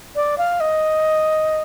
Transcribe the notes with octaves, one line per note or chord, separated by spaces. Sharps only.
D5
F5
D#5